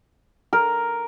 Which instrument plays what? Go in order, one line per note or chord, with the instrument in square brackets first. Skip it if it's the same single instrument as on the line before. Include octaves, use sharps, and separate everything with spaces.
[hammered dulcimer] A#4